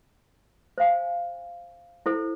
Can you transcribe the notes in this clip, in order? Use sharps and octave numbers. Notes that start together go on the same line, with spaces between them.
C5 F5 G#5
E4 A4 C5